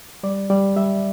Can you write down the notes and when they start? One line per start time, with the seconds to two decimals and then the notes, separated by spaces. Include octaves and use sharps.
0.23 G3 D5
0.50 G3 D5
0.76 G3 E5